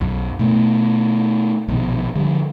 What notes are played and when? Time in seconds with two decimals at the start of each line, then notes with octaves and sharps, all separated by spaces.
0.01 B1 F#2
0.39 B2 A3 B3
1.68 A#1 B2 D#3
2.16 D3 F3 G3